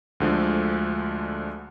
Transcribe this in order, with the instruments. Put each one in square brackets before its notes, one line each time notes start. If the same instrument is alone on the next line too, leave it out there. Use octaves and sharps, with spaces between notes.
[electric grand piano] D2 D3 F3 G#3